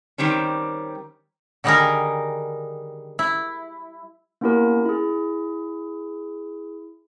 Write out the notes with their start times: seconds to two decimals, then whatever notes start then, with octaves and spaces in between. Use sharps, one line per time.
0.18 D#3 G3 C4 C#4
1.64 D3 D#3 G3 D#4 G#4 A#4
3.19 E4
4.41 A#3 B3 C#4 E4 G4 A#4
4.85 E4 G#4